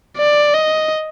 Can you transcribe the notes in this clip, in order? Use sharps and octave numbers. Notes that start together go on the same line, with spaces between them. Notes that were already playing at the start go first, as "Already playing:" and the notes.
D5
D#5